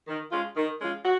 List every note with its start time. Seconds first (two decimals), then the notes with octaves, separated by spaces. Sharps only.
0.08 D#3
0.32 G#3 C#4 F4
0.56 D#3
0.80 G#3 C#4 F4
1.04 F#4